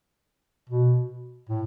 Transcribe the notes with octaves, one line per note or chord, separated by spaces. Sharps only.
B2
A2